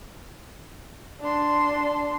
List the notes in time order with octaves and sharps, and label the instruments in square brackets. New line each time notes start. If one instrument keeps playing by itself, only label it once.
[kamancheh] D4 C6